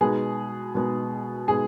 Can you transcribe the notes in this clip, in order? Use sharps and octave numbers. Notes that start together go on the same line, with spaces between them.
B2 G#3 B3 D#4 G#4
B2 G#3 B3 D#4
B2 G#3 B3 D#4 G#4